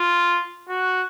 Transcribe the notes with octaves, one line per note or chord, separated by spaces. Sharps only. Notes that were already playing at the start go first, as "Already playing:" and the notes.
Already playing: F4
F#4